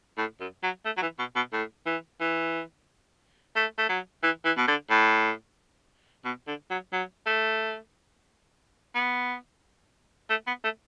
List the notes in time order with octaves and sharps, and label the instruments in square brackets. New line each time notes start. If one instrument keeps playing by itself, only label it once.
[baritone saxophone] A2
F#2
F#3
A3
F#3
E3
B2
B2
A2
E3
E3
A3
A3
F#3
E3
E3
B2
D3
A2
B2
D3
F#3
F#3
A3
B3
A3
B3
A3